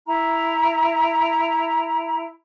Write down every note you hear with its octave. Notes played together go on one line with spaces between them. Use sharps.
E4 A#5